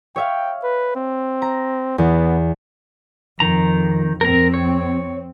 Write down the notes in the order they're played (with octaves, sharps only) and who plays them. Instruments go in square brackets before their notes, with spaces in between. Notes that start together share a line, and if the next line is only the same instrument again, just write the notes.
[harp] C#5 E5 F5 [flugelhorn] G5
[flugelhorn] B4
C4
[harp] A#5
[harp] E2 [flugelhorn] B3
[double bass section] F2 [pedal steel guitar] D#3 A#5
[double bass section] F2 C4 [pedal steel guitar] A#4 A#5
[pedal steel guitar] C#5